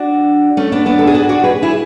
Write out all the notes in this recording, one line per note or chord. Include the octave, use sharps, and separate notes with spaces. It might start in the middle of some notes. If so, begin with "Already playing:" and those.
Already playing: D4 F#4
A3 C#4
B3 D4
B3 D4
A4
G#4
D4 F#4
D4 F#4
G#4 B4
E4 G#4